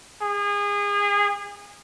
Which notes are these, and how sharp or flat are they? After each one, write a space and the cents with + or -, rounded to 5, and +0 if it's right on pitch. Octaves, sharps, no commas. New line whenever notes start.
G#4 -30